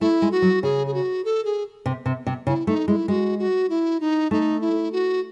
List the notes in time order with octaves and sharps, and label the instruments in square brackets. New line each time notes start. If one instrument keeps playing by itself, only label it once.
[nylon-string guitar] A3 [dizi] E4
[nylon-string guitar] G#3
[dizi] F#4
[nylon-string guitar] F#3
[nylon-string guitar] C#3 [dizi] G#4
[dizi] G#4
F#4
A4
G#4
[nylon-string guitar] C3
C3
C3
[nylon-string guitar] C#3 [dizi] E4
[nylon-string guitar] A3 [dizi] D#4
[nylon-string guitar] G#3 [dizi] E4
[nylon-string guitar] G#3 [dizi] F#4
[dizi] F#4
E4
D#4
[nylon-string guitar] A3 [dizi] D#4
[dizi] E4
F#4